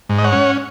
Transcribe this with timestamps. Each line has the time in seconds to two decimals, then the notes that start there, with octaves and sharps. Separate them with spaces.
0.09 G#2
0.18 D#5
0.24 C#5 F#5
0.32 C#4